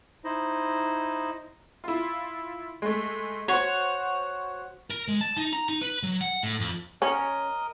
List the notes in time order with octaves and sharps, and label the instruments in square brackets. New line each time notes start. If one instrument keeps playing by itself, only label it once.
[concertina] D#4 E4 C5 D#5
[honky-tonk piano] E4 F4
G#3 A3
[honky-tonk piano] F#4 C5 [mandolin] C#5
[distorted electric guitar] A#4
G#3
A5
D#4
A#5
D#4
B4
F#3
F#5
A2
F2
[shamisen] C#4 [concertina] A#4 D#5